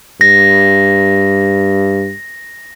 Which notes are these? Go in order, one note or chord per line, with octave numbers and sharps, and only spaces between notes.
G2 A#6